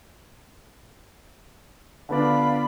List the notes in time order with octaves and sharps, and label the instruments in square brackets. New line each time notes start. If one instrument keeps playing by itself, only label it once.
[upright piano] D3 B3 D4 [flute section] F4 D5 B5